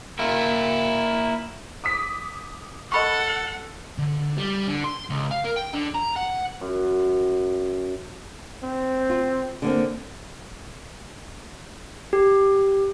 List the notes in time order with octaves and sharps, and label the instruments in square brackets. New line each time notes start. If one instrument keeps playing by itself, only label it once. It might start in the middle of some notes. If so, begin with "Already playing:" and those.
[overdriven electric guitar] A#3 E4
[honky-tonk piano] D6 D#6 B6
[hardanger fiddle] A4 [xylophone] D#5 B5 C#6 [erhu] F#5
[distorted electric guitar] D3
G3
D3
C6
C#2
F5
A#4
G5
D3
A#5
F#5
[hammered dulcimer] F#2
[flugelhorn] C4
[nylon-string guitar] F4
D3 A#3 C4
[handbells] G4